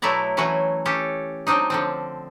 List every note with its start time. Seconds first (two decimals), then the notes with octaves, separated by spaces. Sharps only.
0.02 B2 F#3 A3 E4 D5 A#5
0.37 E3 F#3 A3 C#4 F#4
0.85 C#4 G4 A4
1.47 F#3 C4 D4 D#4
1.70 D3 F3 C4